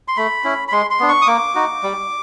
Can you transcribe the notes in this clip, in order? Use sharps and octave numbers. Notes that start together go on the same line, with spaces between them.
C6
A3 B5
C#4 E4
B5
G#3 C6
C6
B3 D4
C#6
D#6
A#3 D6
D#4 F#4
G3